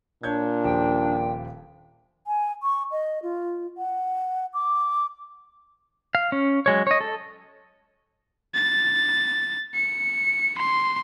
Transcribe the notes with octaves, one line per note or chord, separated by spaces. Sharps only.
A#2 D4 C#5 G6 G#6
D#1 F3 G4 G5
G#5
C#6
D#5
F4
F#5
D6
F5
C#4
F#3 G#3 C#5
C#5 D#5
A4
A6
C#7
C6